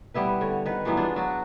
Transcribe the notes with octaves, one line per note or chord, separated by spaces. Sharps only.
G3 B3 E4 B4
D3 C#5
D#3 B4
G2 E3 F#3 B3
D4 F4 G#4
F#3 F#4